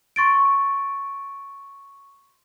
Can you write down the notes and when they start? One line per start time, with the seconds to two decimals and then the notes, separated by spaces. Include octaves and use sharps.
0.16 C6 C#6 A6 D7